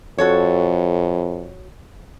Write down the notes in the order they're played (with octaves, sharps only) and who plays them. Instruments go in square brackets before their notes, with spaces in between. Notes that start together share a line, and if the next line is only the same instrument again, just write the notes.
[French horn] F2 [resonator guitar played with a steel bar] F#4 A4 C#5